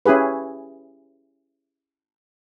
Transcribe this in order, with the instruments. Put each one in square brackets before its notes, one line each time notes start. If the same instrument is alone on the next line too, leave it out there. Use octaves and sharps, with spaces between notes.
[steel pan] C#4 E4 G4 G#4 B4